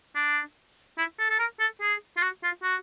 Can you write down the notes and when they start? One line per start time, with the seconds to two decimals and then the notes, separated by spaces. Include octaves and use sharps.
0.15 D4
0.98 E4
1.19 A4
1.30 A4
1.39 A#4
1.60 A4
1.81 G#4
2.17 F4
2.22 F#4
2.43 F4
2.63 F#4